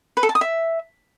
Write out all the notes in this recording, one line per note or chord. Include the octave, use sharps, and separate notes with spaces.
B4
A4
A5
D#6
E5